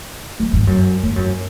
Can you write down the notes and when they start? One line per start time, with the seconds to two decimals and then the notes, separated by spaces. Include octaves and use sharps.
0.40 F#2
0.53 G#2
0.67 F#2
1.03 G#2
1.16 F#2